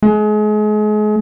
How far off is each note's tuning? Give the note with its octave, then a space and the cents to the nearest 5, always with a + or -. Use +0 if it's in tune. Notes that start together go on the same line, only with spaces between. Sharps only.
G#3 +35